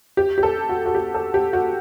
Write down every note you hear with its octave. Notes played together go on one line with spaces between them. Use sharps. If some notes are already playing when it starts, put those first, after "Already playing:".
G4
G4
A4
F#4
F#4
G4
A4
G4
F#4